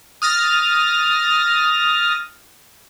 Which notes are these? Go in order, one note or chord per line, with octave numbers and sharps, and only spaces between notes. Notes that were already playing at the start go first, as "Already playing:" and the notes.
D#6 F6 A6 A#6